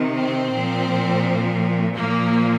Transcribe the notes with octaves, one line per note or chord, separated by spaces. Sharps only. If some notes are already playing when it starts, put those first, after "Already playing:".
Already playing: C3 D#3
C4
A#2 F3
A#2 F3 A#3